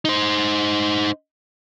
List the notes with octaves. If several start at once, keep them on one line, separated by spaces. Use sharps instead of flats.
D#4 C5